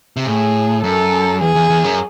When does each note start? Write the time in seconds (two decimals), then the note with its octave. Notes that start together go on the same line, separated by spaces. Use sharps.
0.17 C3
0.26 A2 G#4
0.84 F#2 A4
1.41 E2 G#4
1.55 E2
1.70 E2
1.84 F#2